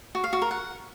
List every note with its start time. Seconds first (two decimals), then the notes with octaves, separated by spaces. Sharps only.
0.15 F#4
0.24 F5
0.33 F#4
0.42 A#4
0.51 F#5